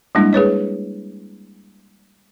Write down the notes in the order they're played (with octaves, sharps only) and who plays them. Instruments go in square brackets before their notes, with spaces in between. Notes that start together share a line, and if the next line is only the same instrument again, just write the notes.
[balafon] G3 G#3 A#3 D4 E4
G#4 B4 C#5 D#5